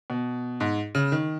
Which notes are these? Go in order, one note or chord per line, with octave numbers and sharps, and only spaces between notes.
B2
G#2
C#3
D#3